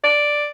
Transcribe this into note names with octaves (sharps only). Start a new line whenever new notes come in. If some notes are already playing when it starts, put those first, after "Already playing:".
D5